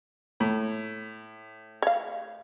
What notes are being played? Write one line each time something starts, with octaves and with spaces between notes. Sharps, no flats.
A2
C#5 F5